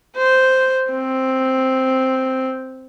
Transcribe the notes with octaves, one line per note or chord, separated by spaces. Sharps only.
C5
C4